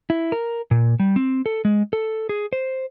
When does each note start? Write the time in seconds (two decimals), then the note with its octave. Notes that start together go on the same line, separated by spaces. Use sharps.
0.10 E4
0.32 A#4
0.71 A#2
1.00 G3
1.16 C4
1.46 A4
1.65 G#3
1.93 A4
2.29 G#4
2.53 C5